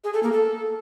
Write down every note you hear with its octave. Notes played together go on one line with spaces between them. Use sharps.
G#4
A4
A#3
A4